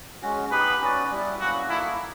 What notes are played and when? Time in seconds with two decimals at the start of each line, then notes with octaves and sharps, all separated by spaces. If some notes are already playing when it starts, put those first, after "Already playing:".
0.22 G#3 C#4 F#4
0.51 B3 D#4 G4 B4
0.81 C#4 F#4 B4 D5
1.11 G3 B3 E4
1.40 F#3 A#3 C#4 E4 F#4
1.69 A#3 D#4 E4 F#4 A4